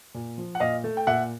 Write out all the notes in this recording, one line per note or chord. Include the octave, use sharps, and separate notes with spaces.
A#2
F3
F#5
A#2 D#5 F5
A3
G5
A#2 E5 F#5